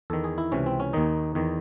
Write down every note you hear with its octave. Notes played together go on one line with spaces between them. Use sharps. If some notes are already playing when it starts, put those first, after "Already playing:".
E2 D#3 A4
G#4
E4
C#2 C3 E3 C#4
C4
C#4
D#2 D#3 D#4
E2 D#3